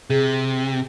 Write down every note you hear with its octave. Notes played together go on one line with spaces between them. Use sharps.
C3 G#4